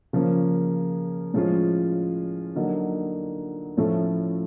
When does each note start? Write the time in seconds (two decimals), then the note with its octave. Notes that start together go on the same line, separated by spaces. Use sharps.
0.13 C#3 F3 A#3 C#4
1.34 A2 F3 G#3 C#4 F4
2.56 D3 F#3 A#3 D#4
3.77 A2 F3 A3 C#4 F4